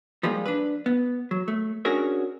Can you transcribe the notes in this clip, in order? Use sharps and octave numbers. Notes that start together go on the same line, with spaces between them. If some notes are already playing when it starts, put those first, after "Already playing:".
F3 G3 G#3 A#3 F4
D4 B4
B3
F#3
A3
C#4 D4 F#4 G#4 A#4 C#5